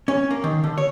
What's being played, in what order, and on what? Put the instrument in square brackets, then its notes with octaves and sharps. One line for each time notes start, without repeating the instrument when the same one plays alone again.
[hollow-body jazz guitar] C#4
A#3
D#3
D3
C#5